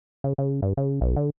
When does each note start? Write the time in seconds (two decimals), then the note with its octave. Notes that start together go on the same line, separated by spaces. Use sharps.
0.24 C#3
0.38 C#3
0.62 G2
0.77 C#3
1.01 B1
1.16 D3